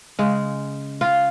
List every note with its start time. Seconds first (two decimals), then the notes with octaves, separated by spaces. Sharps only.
0.19 C#3 G#3
1.01 F4